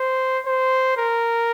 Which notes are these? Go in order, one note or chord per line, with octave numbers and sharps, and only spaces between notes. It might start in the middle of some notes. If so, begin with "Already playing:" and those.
Already playing: C5
C5
A#4